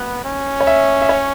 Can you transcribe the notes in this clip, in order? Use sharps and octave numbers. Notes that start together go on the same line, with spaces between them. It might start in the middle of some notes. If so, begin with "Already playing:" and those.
Already playing: B3 F#6
C#4
C#5
E5
E5
C#5